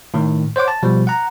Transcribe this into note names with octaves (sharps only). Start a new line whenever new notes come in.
A2 D#3
C5 C#5 F#5 D6
A5
B2 F3 G3
F#5 A#5